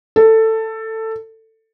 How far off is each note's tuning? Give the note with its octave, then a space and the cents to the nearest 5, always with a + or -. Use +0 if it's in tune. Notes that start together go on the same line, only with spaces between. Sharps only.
A4 +15